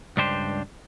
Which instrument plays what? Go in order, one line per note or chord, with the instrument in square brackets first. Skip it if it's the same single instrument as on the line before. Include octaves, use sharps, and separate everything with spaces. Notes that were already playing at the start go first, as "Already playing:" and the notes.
[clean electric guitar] C#2 G2 D4 G4 C5